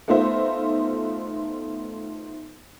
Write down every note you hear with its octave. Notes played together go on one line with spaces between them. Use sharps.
A3 B3 D#4 F4 C5 E5